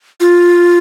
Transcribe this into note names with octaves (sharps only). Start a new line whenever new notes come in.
F4